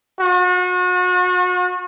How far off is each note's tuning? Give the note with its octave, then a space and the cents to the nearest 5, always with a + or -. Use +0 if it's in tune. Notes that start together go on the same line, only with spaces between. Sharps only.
F#4 -35